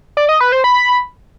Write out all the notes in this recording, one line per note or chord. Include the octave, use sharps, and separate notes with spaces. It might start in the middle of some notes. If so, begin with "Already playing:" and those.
D5
D#5
B4
C5
B5